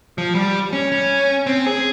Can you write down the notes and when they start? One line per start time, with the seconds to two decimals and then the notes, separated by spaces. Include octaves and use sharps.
0.18 F3
0.35 G3
0.73 C#4
0.92 C#4
1.47 C4
1.67 G#4